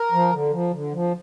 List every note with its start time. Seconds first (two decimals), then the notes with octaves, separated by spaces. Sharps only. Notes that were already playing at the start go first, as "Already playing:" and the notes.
Already playing: A#4
0.12 F3
0.32 D3
0.52 F3
0.73 D3
0.93 F3